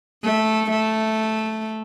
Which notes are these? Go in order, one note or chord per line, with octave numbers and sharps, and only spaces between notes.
A3
A3